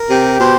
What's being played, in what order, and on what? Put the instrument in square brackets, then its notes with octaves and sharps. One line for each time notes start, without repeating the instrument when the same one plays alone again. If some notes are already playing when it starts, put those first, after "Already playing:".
Already playing: [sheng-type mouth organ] A#4
[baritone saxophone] C3 [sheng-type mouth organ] G4
[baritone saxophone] B2 [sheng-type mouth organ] C5